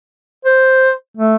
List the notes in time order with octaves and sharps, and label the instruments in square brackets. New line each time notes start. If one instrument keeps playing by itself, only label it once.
[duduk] C5
A3